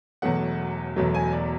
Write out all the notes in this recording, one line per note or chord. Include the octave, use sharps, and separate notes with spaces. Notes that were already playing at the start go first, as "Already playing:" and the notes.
E1 E2 B2 F#3 A3 F#5
E1 E2 B2 F#3 A3
G#5
D5